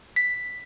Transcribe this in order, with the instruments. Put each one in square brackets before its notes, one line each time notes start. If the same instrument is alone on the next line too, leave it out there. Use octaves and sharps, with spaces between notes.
[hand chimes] B6